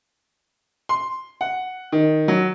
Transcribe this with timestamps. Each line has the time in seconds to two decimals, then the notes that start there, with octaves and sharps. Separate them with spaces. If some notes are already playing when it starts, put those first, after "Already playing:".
0.89 C6
1.41 F#5
1.92 D#3
2.28 F#3